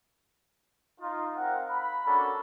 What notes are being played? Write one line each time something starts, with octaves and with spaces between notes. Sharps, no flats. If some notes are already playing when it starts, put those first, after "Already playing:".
D#4 F4
C4 A#4 F5 F#5
B5
A#3 C#4 D4 F#4 A4